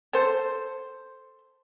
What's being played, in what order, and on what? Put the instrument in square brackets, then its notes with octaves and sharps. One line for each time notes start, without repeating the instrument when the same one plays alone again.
[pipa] A4 C5